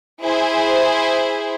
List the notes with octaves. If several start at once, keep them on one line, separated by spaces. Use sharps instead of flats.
E4 G#4 C5